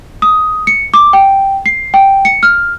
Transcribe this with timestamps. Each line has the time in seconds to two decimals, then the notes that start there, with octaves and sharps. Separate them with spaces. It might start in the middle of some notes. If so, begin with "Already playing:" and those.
0.22 D#6
0.67 C#7
0.94 D6
1.13 G5
1.66 C7
1.94 G5
2.25 C#7
2.43 F6